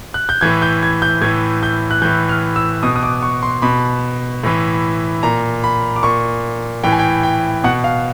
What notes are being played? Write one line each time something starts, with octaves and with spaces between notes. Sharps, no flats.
F#6
G6
A2 E3 G#6
G6
G#6
G6
A2 E3 G#6
G6
F#6
A2 E3 G6
F6
E6
B2 D#6
D#6
D6
C#6
C6
B2 B5
A2 E3
A#2 A#5
B5
D6
A#2 C#6
A2 E3 G5
G#5
G5
G5
B2 F#5
F5